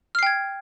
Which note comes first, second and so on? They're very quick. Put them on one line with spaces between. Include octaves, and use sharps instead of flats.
F6 C7 G5 G#6